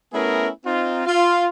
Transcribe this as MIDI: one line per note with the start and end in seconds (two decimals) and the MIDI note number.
0.14 0.49 57
0.14 0.49 59
0.14 0.49 61
0.14 0.49 64
0.14 0.49 68
0.14 0.49 70
0.66 1.03 60
0.66 1.03 63
0.66 1.03 65
1.06 1.47 65